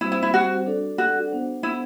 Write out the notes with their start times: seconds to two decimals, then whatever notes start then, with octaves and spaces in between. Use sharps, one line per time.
0.01 G3 C4 E4 F#4 C5
0.12 E4
0.23 E4
0.34 F#4
0.66 D4 F#4 A4 D5
0.98 F#4
1.31 B3 D4 F#4 C5 F#5
1.63 E4